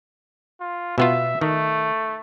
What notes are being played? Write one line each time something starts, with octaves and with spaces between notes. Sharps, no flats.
F4
B2 B3 F4 E5
D#3 A3